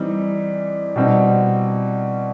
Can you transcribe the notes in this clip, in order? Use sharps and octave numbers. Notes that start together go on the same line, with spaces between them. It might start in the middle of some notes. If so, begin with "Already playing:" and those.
Already playing: E3 G3 C4 D#4
B2 G3 C4 D#4